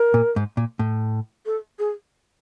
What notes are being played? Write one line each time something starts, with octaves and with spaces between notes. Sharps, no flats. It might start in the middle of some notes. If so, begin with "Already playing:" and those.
Already playing: A#4
A#2
G#2
A#2
A2
A4
G#4